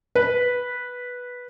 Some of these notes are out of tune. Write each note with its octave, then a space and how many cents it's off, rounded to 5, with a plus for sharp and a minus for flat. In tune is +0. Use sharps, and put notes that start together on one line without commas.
B4 -5